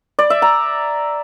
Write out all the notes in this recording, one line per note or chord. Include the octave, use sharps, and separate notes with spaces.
D5
E5
A#5